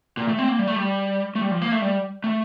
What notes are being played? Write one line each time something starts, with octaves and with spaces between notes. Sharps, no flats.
A#2
A3
C4
A#3
G3
A3
G3
A3
G3
F3
A#3
A3
G3
A3